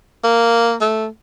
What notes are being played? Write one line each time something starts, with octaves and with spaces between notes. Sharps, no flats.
A#3
A3